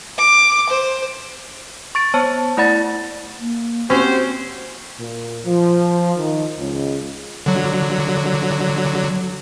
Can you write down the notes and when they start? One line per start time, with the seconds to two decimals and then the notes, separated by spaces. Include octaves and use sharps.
0.19 D6
0.70 C5
1.95 C#6 A6 D7
2.14 B3 C5 C#5 A5
2.57 A3 E4 D5 F#5 B5 A6
3.39 A#3
3.90 C4 C#4 F#4 G4 C5
4.98 A#2
5.45 F3
6.18 D#3
6.57 C#2
7.46 D3 F#3